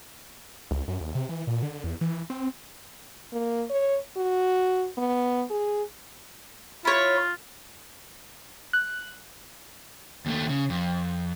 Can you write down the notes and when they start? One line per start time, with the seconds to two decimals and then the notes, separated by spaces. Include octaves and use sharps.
0.71 C#2
0.88 F#2
1.01 D#2
1.15 C3
1.29 E3
1.47 A#2
1.62 D3
1.84 E2
2.01 E3
2.30 C4
3.33 A#3
3.70 C#5
4.17 F#4
4.97 B3
5.50 G#4
6.85 E4 F4 C#5
8.73 F#6
10.26 D#2 A3
10.49 C#3
10.70 F2